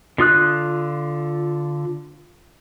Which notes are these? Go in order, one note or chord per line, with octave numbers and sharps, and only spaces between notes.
D3 F4 D#6 F#6